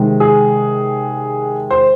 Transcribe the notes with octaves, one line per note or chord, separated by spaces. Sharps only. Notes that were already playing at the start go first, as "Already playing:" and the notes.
Already playing: C3 D#3 G#3
G#4
C5